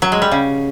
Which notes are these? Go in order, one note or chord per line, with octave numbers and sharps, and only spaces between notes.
F#3
G#3
G3
C#3